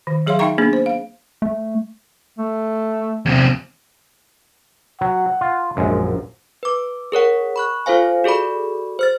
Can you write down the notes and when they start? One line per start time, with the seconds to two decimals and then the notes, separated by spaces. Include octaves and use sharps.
0.07 D#3
0.26 F#3 G#4 C#5 E5 F5 C6
0.39 D#4 E5 F5 G5 A#5 C#6
0.58 A#3 B3 D4 G#4
0.73 C5
0.86 F5
1.42 A3
2.39 A3
3.26 E2 C3
5.01 F#3 F#5
5.41 F4
5.77 A#1 F#2 G#3
6.63 B4 D6
7.12 G#4 A#4 C#5 F#5
7.56 B5 C#6 F#6
7.86 F4 A4 C5 F5 G#5
8.24 F#4 G#4 A4 D5 B5
8.99 C5 F6 A6